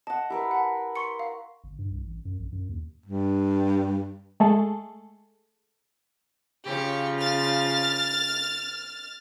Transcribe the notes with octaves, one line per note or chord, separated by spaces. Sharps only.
D#5 F#5 A5
E4 G4 A#4 B4
F#5 A5
C6 C#6 C#7
F5
G1
G2
C2
A1
F#2
A#1
F#2
D#2
G2
G#3 A3 G#4 A4
C#3 F3 G4 C#5
F6 A6